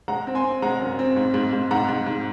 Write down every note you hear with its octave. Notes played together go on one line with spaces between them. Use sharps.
G#3 F#5 A#5
C4
G#5 C6
C4
G#3 F#5 A#5
F#2
C4
G#2
G#2
G#2
G#2 F#5 A#5
G#2
G#2